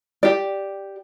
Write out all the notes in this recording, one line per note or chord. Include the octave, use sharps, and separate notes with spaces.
G4 D5